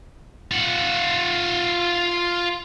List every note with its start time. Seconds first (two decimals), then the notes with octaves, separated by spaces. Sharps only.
0.51 F4 F#5